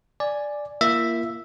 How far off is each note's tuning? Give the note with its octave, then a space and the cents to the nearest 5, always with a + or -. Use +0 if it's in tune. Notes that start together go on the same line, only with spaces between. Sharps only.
D5 +0 G#5 +0
A#3 +10 F4 -45 E5 +0